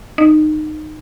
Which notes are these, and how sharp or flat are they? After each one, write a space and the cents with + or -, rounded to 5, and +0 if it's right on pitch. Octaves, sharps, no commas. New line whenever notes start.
D#4 -20